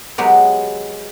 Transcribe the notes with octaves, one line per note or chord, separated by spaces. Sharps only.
F#3 G#3 B3 G4